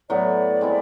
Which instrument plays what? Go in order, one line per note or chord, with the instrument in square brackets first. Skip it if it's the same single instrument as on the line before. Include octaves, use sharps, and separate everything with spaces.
[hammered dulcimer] A2 F#3 B3 E4 [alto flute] D5
[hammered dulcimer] G#3 C4 E4